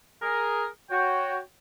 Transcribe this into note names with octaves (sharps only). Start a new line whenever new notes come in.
G#4 A#4
F#4 C#5 G5